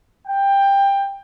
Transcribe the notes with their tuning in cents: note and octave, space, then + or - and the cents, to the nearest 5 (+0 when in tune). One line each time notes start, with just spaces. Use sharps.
G5 +15